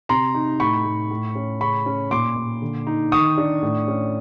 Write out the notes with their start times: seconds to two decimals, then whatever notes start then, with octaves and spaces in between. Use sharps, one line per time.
0.09 C3 A#5 C6
0.35 D#4
0.60 A2 B5 C#6
0.85 A2
1.11 A2
1.35 C#4
1.60 C#3 B5 C#6
1.86 C#4
2.11 A#2 C6 D6
2.36 A#2
2.62 D3
2.87 D#4
3.12 D#3 C#6 D#6
3.38 D4
3.62 A2
3.88 C#4